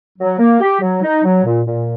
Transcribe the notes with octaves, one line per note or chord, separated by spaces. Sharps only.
F#3
A#3
G4
F#3
D#4
F#3
A#2
A#2